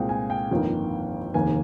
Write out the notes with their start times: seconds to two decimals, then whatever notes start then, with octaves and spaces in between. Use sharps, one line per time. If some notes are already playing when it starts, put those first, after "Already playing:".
Already playing: C2 A#2 G#3 C4 F5 G5
0.09 G#5
0.30 G5
0.51 G1 F2 D#3 A#3
1.34 F1 D#2 D#3 A#3 G#5